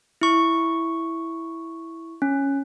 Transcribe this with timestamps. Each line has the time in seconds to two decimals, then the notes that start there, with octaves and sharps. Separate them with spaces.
0.21 E4 C#6
2.22 C#4